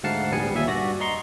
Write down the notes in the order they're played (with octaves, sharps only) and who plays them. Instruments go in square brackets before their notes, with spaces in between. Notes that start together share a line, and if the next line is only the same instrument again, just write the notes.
[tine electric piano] D2 G#2 F5 F#5 A5 C7
A#1 G3 B3 G#5 C#7
D#2 A#2 E5 G#5
G2 F#4 D5 A#6
D#5 A#5 C6 C#6